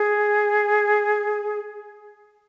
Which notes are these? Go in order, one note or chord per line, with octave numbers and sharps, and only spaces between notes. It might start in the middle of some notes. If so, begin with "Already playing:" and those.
Already playing: G#4